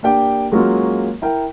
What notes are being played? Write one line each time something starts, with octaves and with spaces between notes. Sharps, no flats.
A#3 D4 G4 G5
F#3 G#3 A#3 C#4 F4 F#4
E4 A#4 G5